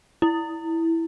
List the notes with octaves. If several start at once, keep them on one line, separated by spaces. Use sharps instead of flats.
E4